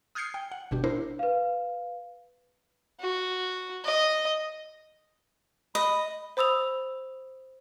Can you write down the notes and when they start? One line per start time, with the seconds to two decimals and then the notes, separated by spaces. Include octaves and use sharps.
0.15 D#6 F6 G6 G#6 C7 C#7
0.34 G5
0.52 F#5
0.71 G1 B2 D4 G4
0.84 D4 E4 A#4 C5
1.19 B4 F5
3.00 F#4
3.84 D#5
5.75 D#5 B5
6.37 C5 B5 D#6 E6 F7